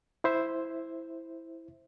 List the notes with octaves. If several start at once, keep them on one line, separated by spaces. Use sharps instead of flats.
E4 C5 E5